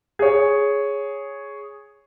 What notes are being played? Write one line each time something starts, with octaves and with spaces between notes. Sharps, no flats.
G#4 C#5